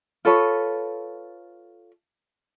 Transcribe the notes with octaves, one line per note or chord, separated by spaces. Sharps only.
F4 A4 B4 C#5